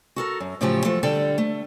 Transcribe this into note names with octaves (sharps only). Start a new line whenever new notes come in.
F#4 A4 A#4
F#2
A2 C#3 F3 F#3 A3 G4
F3 F#3 A3 A4
D3 G3 A4 G5
A3